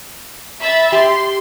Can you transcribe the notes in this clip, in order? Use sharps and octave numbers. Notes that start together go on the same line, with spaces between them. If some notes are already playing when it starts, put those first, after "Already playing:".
E5 B5 A6
G4 C6